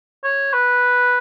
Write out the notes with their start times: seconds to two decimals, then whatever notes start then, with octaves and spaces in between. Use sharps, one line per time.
0.24 C#5
0.54 B4